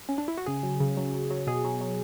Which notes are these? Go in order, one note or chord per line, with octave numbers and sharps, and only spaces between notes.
C#4
D4
E4
F#4
C#3 G#4
F#3
C#3
F#3
F#3
F#3
B2 G#4
F#3
F#3